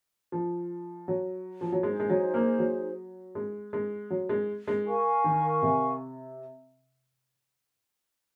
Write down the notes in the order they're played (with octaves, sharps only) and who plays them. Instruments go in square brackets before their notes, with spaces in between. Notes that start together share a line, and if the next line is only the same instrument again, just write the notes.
[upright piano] F3
F#3
F3
F#3
[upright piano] G#3 [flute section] D#4 G#4 C5
[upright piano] G#3
F#3
A#3
F#3
G#3
G#3
F#3
G#3
G#3
[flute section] A#4 F5 G#5 C#6
[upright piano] D#3
C3